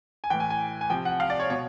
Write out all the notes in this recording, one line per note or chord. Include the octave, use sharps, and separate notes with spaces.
G#5
A2 E3 G5
G#5
G#5
G#5
C3 F3 G5
F#5
F5
D5
C#5
B2 C#5